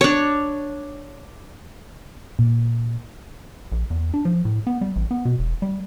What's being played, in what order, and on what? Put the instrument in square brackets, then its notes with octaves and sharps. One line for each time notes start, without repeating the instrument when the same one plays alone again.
[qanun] D4 C#5
[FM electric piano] A#2
[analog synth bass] A#1
E2
D4
F3
A2
B3
G3
A1
B3
B2
E1
G3